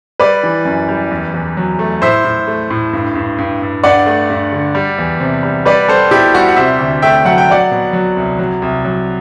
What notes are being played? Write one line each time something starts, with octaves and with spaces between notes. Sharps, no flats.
G3 B4 D5
E3
F#2
G3
E2
E2
F#3
A3
A2 C5 E5
A2
A3
A2
G2
G2
G2
G2
G2 D5 F#5
A3
G2
D3
G3
E2
C3
G3
G3 B4 D5
G3 A4 C5
B2 E4 G4
G3 F#4
F#5
C3 C5 E5
D2
A3 E5 G5
F#3 F#5
G5
F#3 D5 F#5
B2
F#3
C2
F#3
C2
F#3